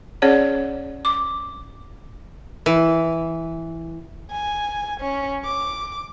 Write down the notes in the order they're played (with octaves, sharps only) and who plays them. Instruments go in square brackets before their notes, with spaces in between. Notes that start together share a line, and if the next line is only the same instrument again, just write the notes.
[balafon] C#4 G#4 C#5 D5 F#5
D6
[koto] E3
[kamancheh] G#5
C#4
D6